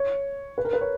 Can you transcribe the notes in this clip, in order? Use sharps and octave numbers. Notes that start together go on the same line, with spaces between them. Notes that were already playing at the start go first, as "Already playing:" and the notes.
Already playing: C#5
B4
A#4
B4
C#5